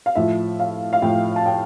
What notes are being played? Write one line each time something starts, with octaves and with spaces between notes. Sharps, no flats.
F5
A2 F3 E5
F5
F5
A2 F3 G5
A5
G5